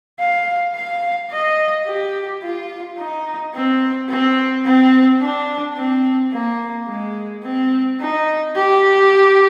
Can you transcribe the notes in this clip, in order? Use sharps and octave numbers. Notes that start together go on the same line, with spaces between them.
F5
F5
D#5
G4
F4
D#4
C4
C4
C4
D4
C4
A#3
G#3
C4
D#4
G4